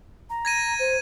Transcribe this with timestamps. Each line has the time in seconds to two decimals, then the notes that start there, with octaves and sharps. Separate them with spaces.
0.30 A#5
0.45 G#6 A#6 D#7
0.79 C5